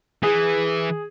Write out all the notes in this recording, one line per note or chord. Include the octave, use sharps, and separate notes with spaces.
E3 G#4